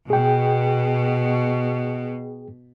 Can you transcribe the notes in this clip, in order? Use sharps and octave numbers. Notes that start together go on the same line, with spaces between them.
B2 G#4 G5